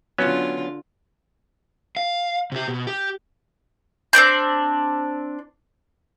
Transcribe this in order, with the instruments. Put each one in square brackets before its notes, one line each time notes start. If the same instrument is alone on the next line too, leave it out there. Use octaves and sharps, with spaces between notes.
[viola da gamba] D3 F4 [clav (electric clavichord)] F#3 B3 C#4
[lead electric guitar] F5
C3 G4
B2
G4
[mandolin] C4 D4 D5 G6